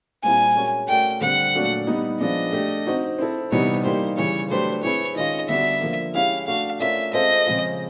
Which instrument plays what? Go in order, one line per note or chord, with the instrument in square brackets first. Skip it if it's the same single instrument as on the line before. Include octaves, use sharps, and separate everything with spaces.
[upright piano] A#2 G3 C4 E4 [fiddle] G#5
[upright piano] G#3 C#4 F#4 A#4 C#5
[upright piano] A3 C#4 F#4 A#4 D5 [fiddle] G5
[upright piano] D3 G3 C4 [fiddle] F#5
[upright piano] A#2 F#3 A3 D4 F#4
G3 B3 D#4
[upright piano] F3 G#3 B3 D4 [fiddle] D#5
[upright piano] A3 D4 G4
C4 D#4 F#4
C4 E4 A4
[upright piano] C3 E3 G3 B3 D#4 [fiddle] C#5
[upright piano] E3 G3 A#3 D#4 G4 [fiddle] C5
[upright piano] C#3 E3 G3 [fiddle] C#5
[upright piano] F#3 A3 D4 G4 B4 [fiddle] C5
[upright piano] C4 E4 G#4 B4 [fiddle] C#5
[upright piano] D#3 G#3 C#4 F4 [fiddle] D#5
[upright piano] D3 G3 B3 D4 F#4 [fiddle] E5
[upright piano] D3 F3 A#3
[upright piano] G#3 C#4 E4 G4 [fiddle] F5
[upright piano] A3 D4 F#4 [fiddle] F5
[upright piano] A3 C#4 F4 A#4 D5 [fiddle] E5
[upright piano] G#3 C4 F4 A4 C5 [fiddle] D#5
[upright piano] C#3 F3 G#3 C4 F4